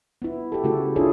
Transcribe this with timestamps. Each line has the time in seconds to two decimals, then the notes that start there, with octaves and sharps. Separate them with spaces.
0.22 B3 E4
0.52 G4 A4
0.64 C#3 A3 E4 F#4 A4
0.96 D4 E4 F4 G#4 A4 C#5